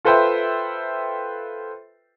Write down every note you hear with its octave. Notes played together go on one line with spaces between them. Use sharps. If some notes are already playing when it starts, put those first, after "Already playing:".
F4 A4 B4 C5 E5 G5